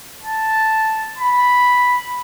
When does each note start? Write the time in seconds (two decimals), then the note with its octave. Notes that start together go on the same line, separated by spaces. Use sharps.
0.24 A5
1.18 B5